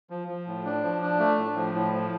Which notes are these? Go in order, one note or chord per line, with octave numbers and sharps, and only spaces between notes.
F3
F3
A2
D4
F3
D4
A3
A2
F3
A2
F3